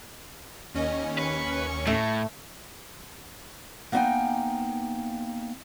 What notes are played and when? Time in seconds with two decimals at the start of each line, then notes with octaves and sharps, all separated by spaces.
0.74 D#2 C#4 D#5
1.19 B4 C#6
1.87 A2 A3
3.92 A#3 B3 D#4 E5 G5 G#5